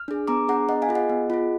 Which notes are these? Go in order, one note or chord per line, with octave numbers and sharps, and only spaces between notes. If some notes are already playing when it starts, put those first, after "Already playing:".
Already playing: F6
D4 G#4
B3 A#5 D6
D4 G#4 F#5 A#5
B3 D#5 F#5
F5 G#5
F4 G#4
D#5 F#5
B3
F4 G#4